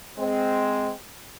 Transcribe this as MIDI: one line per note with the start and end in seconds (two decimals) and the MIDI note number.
0.18 0.89 56
0.18 0.89 60